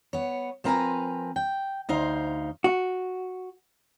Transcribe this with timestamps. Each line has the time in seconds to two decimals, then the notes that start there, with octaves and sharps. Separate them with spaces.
0.13 B3 C#5
0.64 F3 C4 A#4 B4 G#5 A#5
1.36 G5
1.89 D2 D#4 C5 F5
2.64 F#4